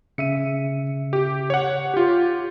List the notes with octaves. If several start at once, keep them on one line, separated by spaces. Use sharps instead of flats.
C#3 E5 C#7 D#7
G4
C#5 F#5
F4 G4